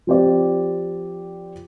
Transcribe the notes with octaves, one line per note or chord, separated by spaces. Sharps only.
F3 C4 G4 D5